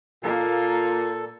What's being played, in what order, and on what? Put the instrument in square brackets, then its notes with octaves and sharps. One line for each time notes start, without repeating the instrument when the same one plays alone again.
[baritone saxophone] A#2 [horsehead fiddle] A#3 [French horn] F4 [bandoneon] A4